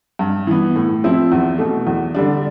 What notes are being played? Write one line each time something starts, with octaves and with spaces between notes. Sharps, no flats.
G2
E3 B3
A2
F3 C4 E4
E2
B2 A3
E2
D3 G3 D4